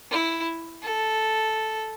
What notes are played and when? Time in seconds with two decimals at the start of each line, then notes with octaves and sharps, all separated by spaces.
0.11 E4
0.83 A4